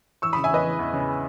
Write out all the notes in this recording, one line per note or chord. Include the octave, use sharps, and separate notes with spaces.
E3 C#6 E6
C#3 B5 D#6
E5 G#5
E2 B4 D#5
E3
E2
C#3